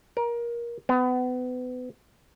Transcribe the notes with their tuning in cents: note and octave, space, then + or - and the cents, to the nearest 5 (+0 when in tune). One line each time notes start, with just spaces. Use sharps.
A#4 +20
B3 +30